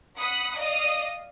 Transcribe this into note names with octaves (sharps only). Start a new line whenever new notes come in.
F#5 B5 D#6 F#6
D5 D#5 F5 D#6